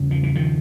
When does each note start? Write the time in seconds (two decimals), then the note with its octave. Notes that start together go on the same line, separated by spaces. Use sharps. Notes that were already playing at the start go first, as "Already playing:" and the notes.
Already playing: E2 C#3
0.11 F3
0.23 E3
0.35 D#3 F3